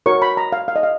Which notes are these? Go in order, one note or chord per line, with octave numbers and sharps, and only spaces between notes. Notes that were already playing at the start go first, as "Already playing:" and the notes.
F#4 A#4 C#5 C#6
B5
A#5
F5
F5
D#5
F5